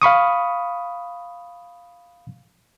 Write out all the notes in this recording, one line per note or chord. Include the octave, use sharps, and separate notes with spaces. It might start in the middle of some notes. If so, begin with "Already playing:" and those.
F5 B5 C#6 D#6